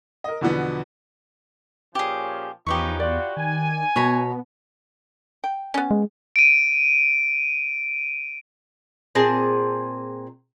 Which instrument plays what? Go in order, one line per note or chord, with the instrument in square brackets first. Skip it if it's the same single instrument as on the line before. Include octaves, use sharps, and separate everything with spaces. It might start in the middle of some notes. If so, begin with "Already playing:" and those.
[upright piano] A#4 D#5
E2 B2 D3 F3 B3
[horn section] A#2 F3 C#4 [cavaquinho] G4 G#4
[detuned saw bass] E2 [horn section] F3 C#4 D#4 [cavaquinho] G4 B4 C#6
[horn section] F4 F#4 [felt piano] D5
[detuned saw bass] D#3 [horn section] G#5
[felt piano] B2 [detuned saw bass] B3 [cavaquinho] C#5 A#5 B5
[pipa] G5
B3 C#4
[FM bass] G#3
[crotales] D7 D#7
[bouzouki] A#2 C4 G#4 A5